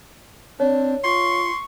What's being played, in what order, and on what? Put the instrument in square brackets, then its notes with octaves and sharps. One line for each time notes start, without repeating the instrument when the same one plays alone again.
[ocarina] C4 [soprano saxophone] D4 [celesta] C#5
[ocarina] F4 [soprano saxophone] C6 [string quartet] C#6